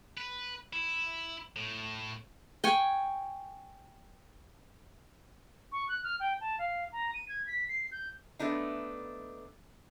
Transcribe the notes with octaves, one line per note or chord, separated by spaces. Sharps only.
B4
E4
A2
G5 G#5 C#6
C#6
F#6
F6
G5
A5
F5
A#5
D#7
G#6
B6
C7
G6
A3 B3 D4 D#4